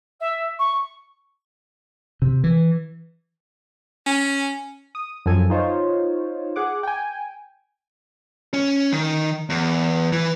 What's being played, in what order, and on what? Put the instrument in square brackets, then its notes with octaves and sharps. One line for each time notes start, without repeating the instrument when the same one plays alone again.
[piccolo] E5
C#6
[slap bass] C3
E3
[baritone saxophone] C#4
[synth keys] D#6
F#2 F3 A4 G#5
D#4 F4 C5 C#5
G#4 F#5 D6
G5 G#5
[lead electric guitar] C#4
D#3
E2
E3